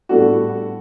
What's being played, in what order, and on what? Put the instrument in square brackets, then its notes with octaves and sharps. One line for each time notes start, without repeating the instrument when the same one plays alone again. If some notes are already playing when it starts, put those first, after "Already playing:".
[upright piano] A2 G3 B3 D4 F#4 A4